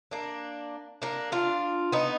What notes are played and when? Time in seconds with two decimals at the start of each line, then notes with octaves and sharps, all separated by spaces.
0.11 A#3 D4
1.02 A#3 D4
1.32 D4 F4
1.92 B3 D#4